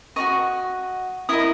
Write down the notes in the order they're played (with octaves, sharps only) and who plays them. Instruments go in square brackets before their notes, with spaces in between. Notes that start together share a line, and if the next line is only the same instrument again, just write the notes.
[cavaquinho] F#4 A#4 D#5 C#6
E4 A#4 D#5 D#6